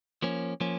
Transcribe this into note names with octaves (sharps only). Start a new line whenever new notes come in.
F3 A#3 C#4
F3 A#3 C#4